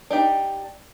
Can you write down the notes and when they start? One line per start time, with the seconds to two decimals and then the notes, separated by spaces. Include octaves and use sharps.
0.10 D4 D#4 G4